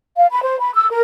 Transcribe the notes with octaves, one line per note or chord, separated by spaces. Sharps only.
F5
B5
C5
B5
E6
A#4